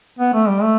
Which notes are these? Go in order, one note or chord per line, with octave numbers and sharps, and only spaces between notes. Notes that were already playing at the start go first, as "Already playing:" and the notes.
B3
A3
G3
A3